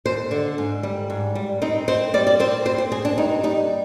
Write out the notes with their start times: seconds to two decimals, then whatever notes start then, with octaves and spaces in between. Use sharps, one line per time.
0.05 D#2 C5
0.31 D3
0.58 G#2
0.83 G3
1.10 G#2
1.35 G3
1.62 C4 D#4
1.88 C4 C5
2.14 G3 D5
2.27 D5
2.40 C4 C5
2.65 C4 C5
2.78 C5
2.92 C4 G#4
3.05 D4
3.18 G2 D#4
3.43 G3 D#4